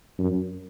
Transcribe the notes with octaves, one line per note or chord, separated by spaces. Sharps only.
F#2